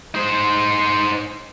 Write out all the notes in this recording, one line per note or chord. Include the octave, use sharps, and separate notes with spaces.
D#4 C5